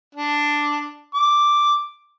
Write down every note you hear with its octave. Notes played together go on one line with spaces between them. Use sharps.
D4
D6